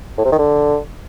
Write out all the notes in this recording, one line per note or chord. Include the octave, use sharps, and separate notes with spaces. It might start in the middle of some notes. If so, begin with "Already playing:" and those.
A2
C3
D#3
D3